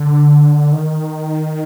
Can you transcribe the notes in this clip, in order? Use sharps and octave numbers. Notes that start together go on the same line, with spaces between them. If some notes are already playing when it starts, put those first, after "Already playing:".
Already playing: D3
D#3